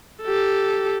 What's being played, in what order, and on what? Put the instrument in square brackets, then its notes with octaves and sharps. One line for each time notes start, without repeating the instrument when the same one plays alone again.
[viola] G4 A4